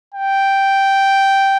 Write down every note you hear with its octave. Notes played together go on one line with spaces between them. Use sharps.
G5